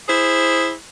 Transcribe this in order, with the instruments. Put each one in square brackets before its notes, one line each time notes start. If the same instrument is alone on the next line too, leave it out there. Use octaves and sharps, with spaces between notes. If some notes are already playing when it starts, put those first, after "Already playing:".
[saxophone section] E4 G#4 C5